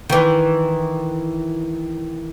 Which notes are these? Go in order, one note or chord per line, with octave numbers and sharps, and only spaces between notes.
D#3 E3